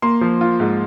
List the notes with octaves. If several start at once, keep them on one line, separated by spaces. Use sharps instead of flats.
A#3 C6
F3
F4
G#2